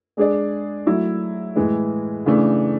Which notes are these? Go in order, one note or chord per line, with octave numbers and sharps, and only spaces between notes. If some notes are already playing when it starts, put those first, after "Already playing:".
G#3 D4 G#4 D5
F#3 A3 E4
A2 E3 G#3
C#3 E3 A3 D4 A4